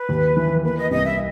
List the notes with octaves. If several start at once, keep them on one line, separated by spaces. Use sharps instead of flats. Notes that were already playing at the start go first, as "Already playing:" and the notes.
Already playing: B4
D#2
E3
A#3 B4
D#5
C2 D#5
E5